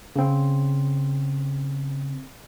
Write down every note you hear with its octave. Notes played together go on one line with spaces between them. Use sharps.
C#3 C4